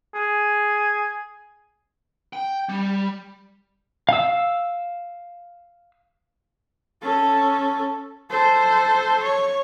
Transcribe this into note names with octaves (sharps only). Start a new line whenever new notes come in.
G#4
G5
G3
F5 E6
C#4 A4
A4 C5
C#5